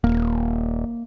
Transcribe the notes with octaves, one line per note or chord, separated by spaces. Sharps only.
D#1 A#3